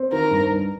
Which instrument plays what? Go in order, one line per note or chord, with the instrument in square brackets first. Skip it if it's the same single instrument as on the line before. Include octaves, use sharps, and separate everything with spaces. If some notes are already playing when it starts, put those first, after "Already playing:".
Already playing: [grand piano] C4
[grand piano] D#3 [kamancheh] A#4
[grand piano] G2
G2